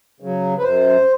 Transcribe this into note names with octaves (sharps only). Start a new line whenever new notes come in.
C#3 F#3
B4
F#2 C5